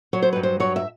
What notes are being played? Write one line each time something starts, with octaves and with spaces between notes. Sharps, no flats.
F#3 C#5
C5
G2 B4
C5
F#3 C#5
E5